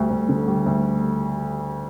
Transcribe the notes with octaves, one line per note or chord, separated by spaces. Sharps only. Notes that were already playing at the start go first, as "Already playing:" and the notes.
Already playing: D2 G3
D2
D3
G3
D2